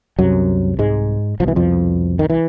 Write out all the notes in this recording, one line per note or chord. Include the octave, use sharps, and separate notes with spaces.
C2 F#2 C3 F#3
G#2 G#3
C2 B2 E3 F3
F2 F3
D#3
E3